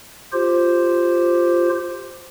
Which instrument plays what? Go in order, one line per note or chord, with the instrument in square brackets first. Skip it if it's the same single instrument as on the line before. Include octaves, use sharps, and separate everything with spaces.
[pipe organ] F4 G4 C5